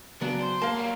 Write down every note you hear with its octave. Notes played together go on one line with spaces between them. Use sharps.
C#3 F#3 B3 D4
C5
A#3 F5 A5
F#3 G3